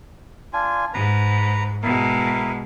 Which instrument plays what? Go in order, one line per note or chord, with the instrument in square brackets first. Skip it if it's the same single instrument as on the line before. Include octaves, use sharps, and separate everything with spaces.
[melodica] D4 F4 G#5
[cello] G#2 [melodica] B4 A#5
[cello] B2 G#3 [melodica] E4 A#4